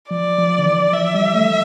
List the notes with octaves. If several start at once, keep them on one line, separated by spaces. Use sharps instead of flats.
F3 D5
F3
D3
E3
F3 E5
G3
A3